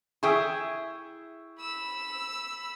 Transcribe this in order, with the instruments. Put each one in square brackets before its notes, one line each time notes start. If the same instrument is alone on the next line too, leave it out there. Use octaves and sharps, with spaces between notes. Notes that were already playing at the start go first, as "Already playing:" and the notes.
[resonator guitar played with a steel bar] E4 G#4 [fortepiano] E5 G5 C#6
[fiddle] B5 E6